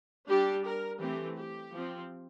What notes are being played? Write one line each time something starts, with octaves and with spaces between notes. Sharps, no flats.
G3 D4 G4
A#4
E3 A3 C4 G4
G4
F3 C4